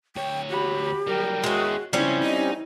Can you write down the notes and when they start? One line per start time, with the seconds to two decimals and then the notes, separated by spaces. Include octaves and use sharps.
0.16 D2 C#5 G5
0.50 F#4 G4 B5
1.07 F#3 G3 A#4 G5
1.44 G#3 C#4 E4 F#4 G#4
1.93 C#3 F3 G3 C4 C#4 E4 C#5
2.23 D#4 D#5